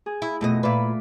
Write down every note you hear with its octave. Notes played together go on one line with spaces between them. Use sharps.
G#4
E4
F2 B2 A3 B3 D#5
A#2 F4 B4 D5 E5